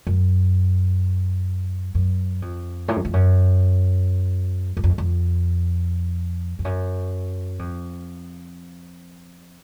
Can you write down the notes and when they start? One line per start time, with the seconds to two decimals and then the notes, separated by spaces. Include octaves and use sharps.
0.07 F#2
1.95 F#2
2.42 F2
2.88 A2
2.96 F#2
3.05 F2
3.13 F#2
4.77 F#2
4.84 F2
4.98 F2
6.59 F2
6.65 F#2
7.59 F2